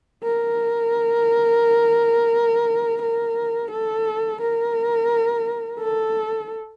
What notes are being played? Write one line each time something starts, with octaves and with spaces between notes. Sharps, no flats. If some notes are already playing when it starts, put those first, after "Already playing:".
A#4
A#4
A4
A#4
A4